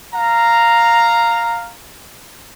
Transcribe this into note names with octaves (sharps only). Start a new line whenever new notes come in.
F5 A#5